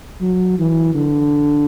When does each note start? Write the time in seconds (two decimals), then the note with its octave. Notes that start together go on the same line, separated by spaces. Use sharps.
0.21 F#3
0.59 E3
0.95 D3